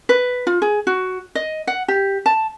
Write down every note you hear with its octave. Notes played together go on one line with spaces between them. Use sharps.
B4
F4
G#4
F#4
D#5
F#5
G4
A5